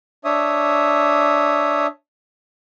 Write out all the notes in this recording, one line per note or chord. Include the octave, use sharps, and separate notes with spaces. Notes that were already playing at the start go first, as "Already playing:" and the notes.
D4 C#5 E5 D#6